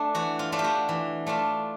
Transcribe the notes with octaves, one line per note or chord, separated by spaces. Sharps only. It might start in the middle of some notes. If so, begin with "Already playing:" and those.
Already playing: A3 D4
E3 F#4
F4
A3 D4 F4
G4
F#4
E3
A3 D4 F4